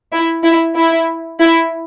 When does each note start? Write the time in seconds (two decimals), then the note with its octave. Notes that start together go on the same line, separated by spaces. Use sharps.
0.11 E4
0.43 E4
0.75 E4
1.39 E4